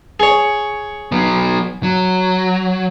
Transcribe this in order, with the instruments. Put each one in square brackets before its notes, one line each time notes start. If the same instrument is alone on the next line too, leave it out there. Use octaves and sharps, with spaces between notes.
[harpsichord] G#4 C#5
[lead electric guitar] F#3 B3
F#3